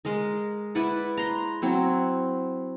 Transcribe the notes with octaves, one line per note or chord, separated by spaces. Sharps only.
G#3 A#4 D#5
E4 B4 D5 F#5
A#5 C6
F#3 C4 E4